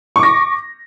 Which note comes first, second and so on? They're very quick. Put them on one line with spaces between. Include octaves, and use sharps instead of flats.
C#6 D6 A#6